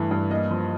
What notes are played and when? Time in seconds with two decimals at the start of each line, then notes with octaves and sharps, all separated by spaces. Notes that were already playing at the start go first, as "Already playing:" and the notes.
Already playing: G2 E3 A3
0.11 G2
0.30 A#3 D#5
0.51 F3